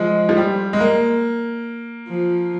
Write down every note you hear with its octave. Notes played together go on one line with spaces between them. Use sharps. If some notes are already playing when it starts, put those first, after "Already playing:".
Already playing: F3 G#3
F3
G3
G#3
A#3
F3